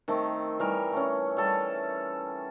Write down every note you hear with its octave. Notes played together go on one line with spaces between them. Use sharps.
D#3 A3 C4
E3 G3 A#4
A3 C#4
G3 A4